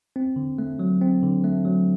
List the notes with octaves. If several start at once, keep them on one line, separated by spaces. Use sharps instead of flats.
C4
D3
A3
F#3
C4
D3
A3
F#3